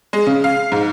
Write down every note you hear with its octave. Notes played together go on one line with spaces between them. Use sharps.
G#3
C#3
F5
G#2